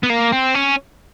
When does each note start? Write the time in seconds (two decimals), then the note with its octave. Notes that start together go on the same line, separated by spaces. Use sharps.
0.03 B3
0.10 A#3
0.32 C4
0.54 C#4